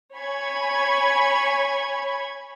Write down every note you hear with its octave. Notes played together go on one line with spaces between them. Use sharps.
C#5 G#5 B5 C#6 G#6